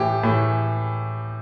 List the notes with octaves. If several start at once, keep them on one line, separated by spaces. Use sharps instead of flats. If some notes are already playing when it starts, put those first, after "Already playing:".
Already playing: A2 E3 G4
A2 E3